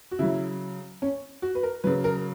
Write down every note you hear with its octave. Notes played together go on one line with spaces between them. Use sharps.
F#4
C#3 F#3 E4
C#4
F#4
B4
A#4
C#3 F#3 B4
A#4